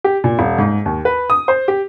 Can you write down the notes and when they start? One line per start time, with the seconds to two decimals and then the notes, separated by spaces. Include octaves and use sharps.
0.04 G4
0.24 A#2
0.39 D#1
0.59 G#2
0.86 D#2
1.05 B4
1.30 D#6
1.48 C5
1.68 G4